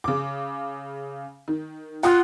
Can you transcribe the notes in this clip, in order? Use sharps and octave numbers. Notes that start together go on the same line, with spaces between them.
C#3 D6
D#3
F4 F#5 D#6 F#6